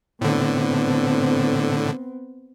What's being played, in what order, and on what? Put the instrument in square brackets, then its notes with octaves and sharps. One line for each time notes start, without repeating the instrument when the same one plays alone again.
[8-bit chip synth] A2 D3 [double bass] B3 C4